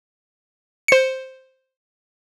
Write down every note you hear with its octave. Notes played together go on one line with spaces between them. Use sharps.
C5 C#7